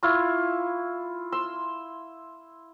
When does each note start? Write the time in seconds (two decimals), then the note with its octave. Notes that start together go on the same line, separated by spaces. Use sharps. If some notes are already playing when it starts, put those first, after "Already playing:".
0.03 E4 F4 C#6
1.32 C6 E6